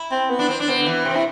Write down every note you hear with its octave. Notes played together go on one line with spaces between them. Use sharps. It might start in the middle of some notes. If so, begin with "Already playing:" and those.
Already playing: E4
C4
B3
D4
C4
D4
B3 C4
D3
E3
C3 C4
E4